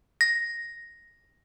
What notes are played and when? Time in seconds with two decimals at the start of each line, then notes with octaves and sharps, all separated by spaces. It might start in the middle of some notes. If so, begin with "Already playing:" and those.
0.21 A#6